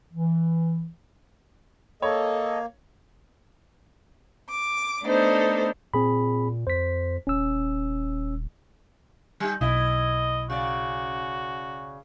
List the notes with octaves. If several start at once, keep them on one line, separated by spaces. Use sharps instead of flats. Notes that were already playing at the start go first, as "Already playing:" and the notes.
E3
A#3 A4 C#5 D#5
D6
A3 B3 D4 D#4 A4 C5
A#2 C4 G#4 B5
F2 C5 B6
D#1 C#4 E6
G3 D#4
B1 E4 D#5
C#3 F#4 D5